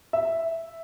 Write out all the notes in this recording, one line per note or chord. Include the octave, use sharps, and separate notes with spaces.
E5